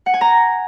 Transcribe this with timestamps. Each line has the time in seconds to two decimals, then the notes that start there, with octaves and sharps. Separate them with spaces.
0.06 F#5
0.14 G#5
0.21 A#5